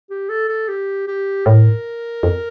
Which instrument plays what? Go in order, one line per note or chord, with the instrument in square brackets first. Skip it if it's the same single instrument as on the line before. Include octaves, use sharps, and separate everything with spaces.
[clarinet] G4
A4
A4
G4
G4
[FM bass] A2 [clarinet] A#4
[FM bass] F2